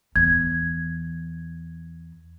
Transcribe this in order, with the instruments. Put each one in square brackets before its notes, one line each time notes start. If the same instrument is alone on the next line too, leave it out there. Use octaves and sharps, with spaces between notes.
[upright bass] E2 [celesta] G#6